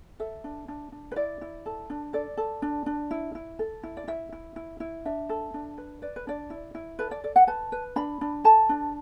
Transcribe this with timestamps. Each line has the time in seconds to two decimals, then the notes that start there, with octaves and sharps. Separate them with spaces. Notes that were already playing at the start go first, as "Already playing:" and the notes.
0.20 A4 E5
0.44 D4
0.68 D4
0.92 D4
1.12 B4
1.16 E4 D5
1.41 E4
1.66 A4
1.90 D4
2.13 A4 D5
2.37 A4
2.62 D4
2.86 D4
3.11 E4
3.35 E4
3.59 A4
3.83 E4
3.97 D5
4.08 E4 E5
4.32 E4
4.56 E4
4.80 E4
5.05 D4 E5
5.29 A4
5.54 D4
5.78 B4
6.02 B4 D5
6.16 B4
6.27 D4 D5
6.50 E4
6.75 E4
6.99 A4 B4
7.11 D5
7.24 A4 D5
7.36 F#5
7.47 B4 A5
7.72 B4
7.96 D4 B5
8.21 D4
8.44 A4 A5
8.69 D4